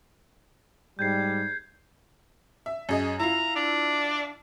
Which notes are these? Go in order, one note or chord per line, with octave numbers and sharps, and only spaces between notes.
G#2 G3 G6 G#6 C7
E5
F#2 G#4 D#5
E4 F4 A#5
D4